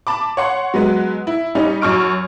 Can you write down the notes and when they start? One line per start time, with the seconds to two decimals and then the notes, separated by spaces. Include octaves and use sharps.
0.07 A5 B5 D6
0.37 C#5 F#5 C6
0.74 F#3 G#3 B3
1.27 E4
1.55 G3 C#4 D#4
1.81 F#2 F#4 C#6 F6 D7